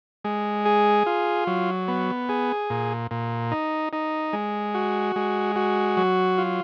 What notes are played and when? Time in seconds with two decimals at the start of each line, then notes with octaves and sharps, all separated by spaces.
0.24 G#3
0.65 G#4
1.06 F4
1.47 F#3
1.88 B3
2.29 G#4
2.70 A#2
3.11 A#2
3.52 D#4
3.93 D#4
4.33 G#3
4.75 F#4
5.16 G#3
5.56 F#4
5.97 F#3
6.38 F4